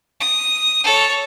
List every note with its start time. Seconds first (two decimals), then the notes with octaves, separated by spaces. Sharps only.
0.20 D#6
0.84 A4 C#5